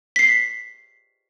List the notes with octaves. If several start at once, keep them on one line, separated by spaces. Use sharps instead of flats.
B6 C7